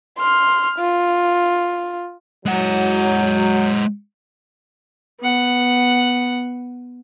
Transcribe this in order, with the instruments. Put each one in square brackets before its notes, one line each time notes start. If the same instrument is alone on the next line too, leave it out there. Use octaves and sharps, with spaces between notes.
[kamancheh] C6 F6
F4
[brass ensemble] F#3 [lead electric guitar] G#3 F#5
[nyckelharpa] B3 F#5